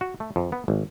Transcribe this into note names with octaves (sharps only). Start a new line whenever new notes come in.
F#4
A3
F2
B3
G#1